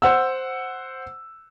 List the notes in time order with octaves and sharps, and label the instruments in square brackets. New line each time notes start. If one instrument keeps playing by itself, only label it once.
[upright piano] C5 F#5 E6